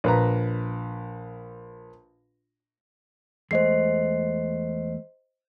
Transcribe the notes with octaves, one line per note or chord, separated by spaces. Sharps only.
A#1 B4 A#5
E2 G#3 A3 C5 D#5 C7